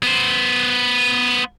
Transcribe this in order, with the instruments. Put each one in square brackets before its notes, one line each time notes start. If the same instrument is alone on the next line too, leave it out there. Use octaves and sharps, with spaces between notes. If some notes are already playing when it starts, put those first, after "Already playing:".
[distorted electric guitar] B3 C5